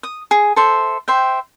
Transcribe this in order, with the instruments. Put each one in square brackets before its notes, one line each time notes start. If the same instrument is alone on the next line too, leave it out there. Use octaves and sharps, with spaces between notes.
[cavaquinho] D#6
G#4
A4 C5 E5
C5 E5 G5